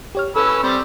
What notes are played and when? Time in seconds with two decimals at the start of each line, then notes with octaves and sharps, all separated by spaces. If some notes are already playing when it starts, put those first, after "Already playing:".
0.15 G4 C#5 F6
0.36 C#4 A4 B4 E6
0.63 G3 C4 C5 D5